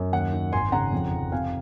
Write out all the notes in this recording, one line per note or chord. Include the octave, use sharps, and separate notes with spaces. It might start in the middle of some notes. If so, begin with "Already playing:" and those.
Already playing: F#2
D#2 F#5
D#3
G#1 G#5 C6
C#3 F#5 A#5
F2
F1
C3 F5 G#5